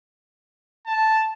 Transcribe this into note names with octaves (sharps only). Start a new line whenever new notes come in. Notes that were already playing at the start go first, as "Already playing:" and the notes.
A5